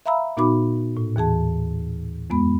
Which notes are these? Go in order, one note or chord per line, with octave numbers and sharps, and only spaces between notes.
E5 F5 A#5 B5 E6
A#2 B3 D#4 F#4 B5 D6
A2
D#2 E3 G#4 A5
F2 G#3 B3 B5